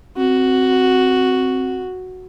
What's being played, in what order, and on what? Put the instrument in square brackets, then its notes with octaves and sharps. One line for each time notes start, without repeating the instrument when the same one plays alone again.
[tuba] C4 [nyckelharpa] F#4